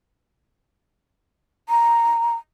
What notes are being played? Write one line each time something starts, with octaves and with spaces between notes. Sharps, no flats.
A#5